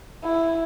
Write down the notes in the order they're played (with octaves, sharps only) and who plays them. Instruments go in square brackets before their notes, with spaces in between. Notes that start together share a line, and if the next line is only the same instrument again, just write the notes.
[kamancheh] E4